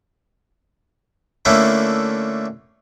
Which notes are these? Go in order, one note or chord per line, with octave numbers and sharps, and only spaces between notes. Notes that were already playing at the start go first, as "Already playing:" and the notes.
D3 A3 A#3 C#4 E4